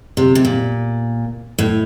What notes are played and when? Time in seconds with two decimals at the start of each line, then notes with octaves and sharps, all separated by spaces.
0.17 C3
0.35 C3
0.45 A#2
1.59 A2